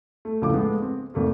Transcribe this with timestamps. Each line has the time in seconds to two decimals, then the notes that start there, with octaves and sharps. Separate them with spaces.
0.25 A3
0.42 C#2 A2 F3 A4 D6
0.53 G#3 A3 B3
0.82 C4
1.14 G#1 A3 A#3